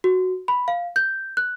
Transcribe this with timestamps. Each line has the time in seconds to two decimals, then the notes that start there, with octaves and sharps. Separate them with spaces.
0.04 F#4
0.48 B5
0.68 F5
0.96 G6
1.37 F#6